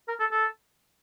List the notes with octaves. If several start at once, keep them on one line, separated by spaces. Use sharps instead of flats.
A#4
A4
A4